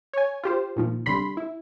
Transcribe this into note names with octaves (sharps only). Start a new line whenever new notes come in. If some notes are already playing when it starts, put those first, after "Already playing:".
C#5 G#5
F4 G4 C5
A#2 D#3 F3
C2 D3 G3 B5 C6
E4